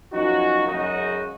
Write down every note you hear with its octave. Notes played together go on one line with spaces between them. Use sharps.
F#2 F3 A#3 C#4 D#4 F#4
F#2 C#3 G#3 D#4 F#4